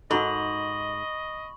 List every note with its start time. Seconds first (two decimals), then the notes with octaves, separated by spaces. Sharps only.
0.11 G#2 D#4 F#4 A4 D#5 B5 C#6 F#7